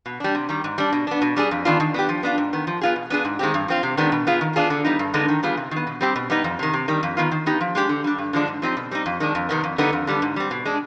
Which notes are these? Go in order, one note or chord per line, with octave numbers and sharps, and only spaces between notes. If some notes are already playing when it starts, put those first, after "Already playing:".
B2
G3 D4
C3
D#3 G3
G#2
G3 D4
B2
B3 D4
B2
G3 D4 G#4
F2
D#3 B3 D4 F4
D#3
B3 D4 G4
F3
B3 D4 F4
G#2
D#3 B3
F3
B3 F4 G#4
B2
B3 D4 G#4
G#2
D#3 G#3 C4 G4
G2
F3 C4 F4
C3
D#3 G#3 B3 D4
B2
B3 F4 G#4
D#3
B3 D4 F4 G#4
D3
G3 B3 D#4
G2
D3 G#3 B3 D#4
D#3
G3 B3 F4 G#4
C3
D#3 B3
B2
G3 C4 G4
B2
G3 B3 D#4
F2
C3 D#3
C3
D#3 G3
F2
D#3 B3 F4
D#3
B3 D#4 G4
F3
G#3 D4 G4
D3
G3 D4
G2
D3 F3 G#3 D4
G#2
F3 C4 D#4 G4
B2
G3 C4 D#4
F2
D#3 G#3 D4
F2
C3 D#3 B3
F2
D3 G3 B3 D#4
F2
D3 G3 B3
G#2
G3 C4
B2
G#3 D4